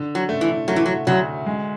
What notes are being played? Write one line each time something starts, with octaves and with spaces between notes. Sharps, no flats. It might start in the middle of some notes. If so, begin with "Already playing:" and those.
Already playing: D3
F#3
A3
E3
F#3 A3
E3
F#3
D2 F#3
G#3